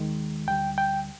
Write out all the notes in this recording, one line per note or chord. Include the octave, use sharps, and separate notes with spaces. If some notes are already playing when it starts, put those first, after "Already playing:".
Already playing: D#2 D#3 G#3
D2 D3 G3 G5
G5